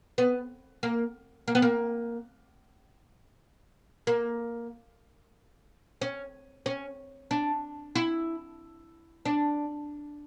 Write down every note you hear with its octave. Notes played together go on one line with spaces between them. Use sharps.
B3
A#3
A#3
B3
A#3
A#3
C#4
C#4
D4
E4
D4